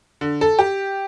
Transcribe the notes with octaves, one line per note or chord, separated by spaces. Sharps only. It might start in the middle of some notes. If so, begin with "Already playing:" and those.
D3
A4
G4